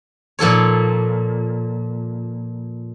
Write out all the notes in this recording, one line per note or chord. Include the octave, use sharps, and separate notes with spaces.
A#2 F3 A4 C#5